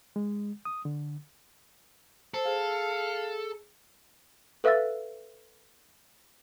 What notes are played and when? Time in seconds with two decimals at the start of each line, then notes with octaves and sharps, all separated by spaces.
0.16 G#3
0.65 D#6
0.85 D3
2.34 A4 C5
2.46 G#4 F5
4.64 A4 B4 E5 F5 E6 A6